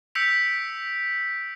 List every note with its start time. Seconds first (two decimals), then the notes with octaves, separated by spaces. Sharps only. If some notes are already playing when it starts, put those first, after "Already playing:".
0.15 E6 G6 B6 C#7 D7 F7